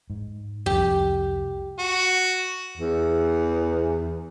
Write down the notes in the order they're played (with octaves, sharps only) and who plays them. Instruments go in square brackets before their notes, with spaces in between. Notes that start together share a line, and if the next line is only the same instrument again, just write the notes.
[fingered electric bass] G#2
[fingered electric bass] C2 F2 [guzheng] G4
[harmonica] F#4
[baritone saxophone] E2